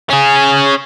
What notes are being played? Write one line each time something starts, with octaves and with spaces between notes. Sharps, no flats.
C#4 G#4